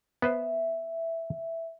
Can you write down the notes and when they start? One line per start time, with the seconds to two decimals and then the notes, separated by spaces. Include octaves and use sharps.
0.22 B3 B4 C5 E5